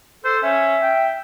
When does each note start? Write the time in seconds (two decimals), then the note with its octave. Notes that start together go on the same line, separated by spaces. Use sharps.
0.25 A4 C5
0.43 C#4 E5
0.82 G5